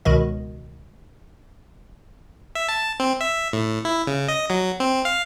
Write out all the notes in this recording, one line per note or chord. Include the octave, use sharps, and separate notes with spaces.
C#2 B2 D#3 F#4 D#5
E5
A5
C4
E5
A2
E4
C#3
D#5
F#3
C4
F5